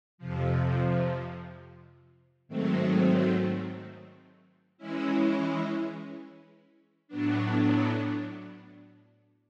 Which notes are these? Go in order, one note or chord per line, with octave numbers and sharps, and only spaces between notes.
F2 C3 F3
G#2 D#3 F#3 A3 C4
E3 G#3 C#4 E4
A2 F#3 B3 D4